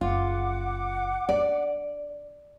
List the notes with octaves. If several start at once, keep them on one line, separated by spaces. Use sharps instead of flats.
F#1 F4 F#5 D6
D4 D5